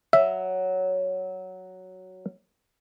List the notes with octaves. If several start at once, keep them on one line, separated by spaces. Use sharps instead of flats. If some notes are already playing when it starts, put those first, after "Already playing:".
F#3 E5